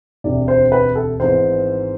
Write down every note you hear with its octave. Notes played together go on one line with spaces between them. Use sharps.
E1 D2 C3 D5
C5
B4
A4
G#1 G#2 E3 B3 C5